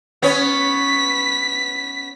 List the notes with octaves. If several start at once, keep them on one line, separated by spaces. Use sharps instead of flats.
B3 C#4 C#5 B6